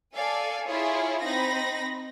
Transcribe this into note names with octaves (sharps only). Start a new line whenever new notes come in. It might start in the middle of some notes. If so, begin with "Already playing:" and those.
A4 D5 F5 G#5
E4 F4 G#4 C#5
C4 D#4 B5 A#6